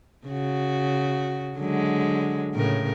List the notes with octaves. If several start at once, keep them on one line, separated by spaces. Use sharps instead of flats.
C#3 F#4
D3 F#3 G#3
A2 C#3 A#4